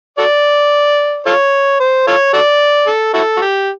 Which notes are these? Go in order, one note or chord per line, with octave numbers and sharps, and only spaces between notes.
F#4 A4 D5
F4 A4 C#5
C5
F4 A4 C#5
F#4 A4 D5
A4
E4 F#4 A4
F#4
G4